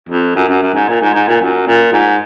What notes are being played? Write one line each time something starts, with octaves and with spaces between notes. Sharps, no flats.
F2
F#2
F#2
F#2
G#2
A#2
G#2
G#2
A#2
F#2
A#2
G#2